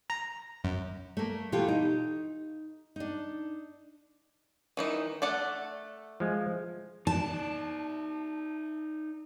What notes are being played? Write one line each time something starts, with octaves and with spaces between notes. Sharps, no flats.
A#5
F#2
A3 A#3
B2 E3 F4 G4 A4
D#4
D4 D#4
D#3 E3 D#4
A3 D5 F#5
F3 G#3
D#4 D5 A5